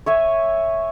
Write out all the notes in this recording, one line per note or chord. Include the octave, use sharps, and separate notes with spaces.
C#5 E5 G#5